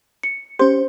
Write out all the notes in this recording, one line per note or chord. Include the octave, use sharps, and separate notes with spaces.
C#7
C#4 G4 C5 C6